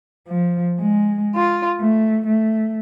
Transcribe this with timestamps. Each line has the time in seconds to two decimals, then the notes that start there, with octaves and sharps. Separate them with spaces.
0.27 F3
0.79 G#3
1.36 F4
1.80 A3
2.25 A3